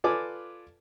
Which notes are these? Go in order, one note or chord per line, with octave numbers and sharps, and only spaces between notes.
F4 A4 B4 D5 G#5 D6